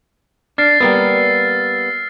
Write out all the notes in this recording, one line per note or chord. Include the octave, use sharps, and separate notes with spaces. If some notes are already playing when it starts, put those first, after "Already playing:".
D4 F6 A6 C7
G3 A#3 B3 E6